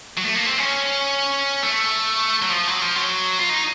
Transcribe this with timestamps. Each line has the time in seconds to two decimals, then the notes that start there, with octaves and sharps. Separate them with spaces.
0.18 F#3
0.24 A3
0.35 A#3
0.47 C4
0.59 C#4
1.63 A3
2.42 F#3
2.50 F3
2.68 F#3
2.82 F3
2.96 F#3
3.39 F4
3.49 D#4